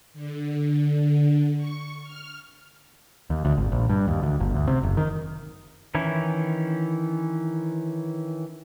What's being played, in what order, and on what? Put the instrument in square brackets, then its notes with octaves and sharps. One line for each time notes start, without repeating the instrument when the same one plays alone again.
[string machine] D3
C#6
F6
[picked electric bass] D#2
D2
G#1
A#1
G2
D#2
D2
G1
D2
C3
F#1
D#3
[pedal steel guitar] D#3 E3 C#4 E4